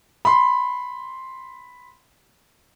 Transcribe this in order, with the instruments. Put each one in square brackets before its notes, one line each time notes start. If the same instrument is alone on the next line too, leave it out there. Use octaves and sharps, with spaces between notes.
[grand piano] B5 C6